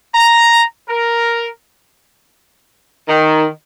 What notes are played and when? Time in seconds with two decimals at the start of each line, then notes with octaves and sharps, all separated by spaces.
0.14 A#5
0.88 A#4
3.08 D#3